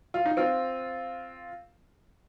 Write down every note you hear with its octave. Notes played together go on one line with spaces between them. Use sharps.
F4
D#4
C4 F4